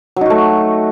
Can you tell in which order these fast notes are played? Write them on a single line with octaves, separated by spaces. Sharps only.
F#3 D#4 F#4 A3